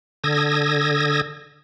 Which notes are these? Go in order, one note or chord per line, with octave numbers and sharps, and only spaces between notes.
D3 D#6 E6 G#6 A#6